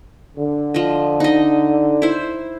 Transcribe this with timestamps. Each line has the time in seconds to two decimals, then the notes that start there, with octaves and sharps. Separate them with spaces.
0.37 D3
0.74 F3 D#5
1.20 D#4 D#5
2.02 E4 C5